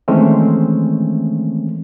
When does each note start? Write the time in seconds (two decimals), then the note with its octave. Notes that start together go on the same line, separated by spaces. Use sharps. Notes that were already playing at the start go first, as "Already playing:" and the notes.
0.08 D#3 E3 G#3 A3 C4 C#4